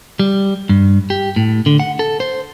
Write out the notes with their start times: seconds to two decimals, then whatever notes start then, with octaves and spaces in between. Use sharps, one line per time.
0.19 G3
0.69 G2
1.10 G4
1.36 A2
1.66 D3
1.80 F#5
1.99 A4
2.20 C5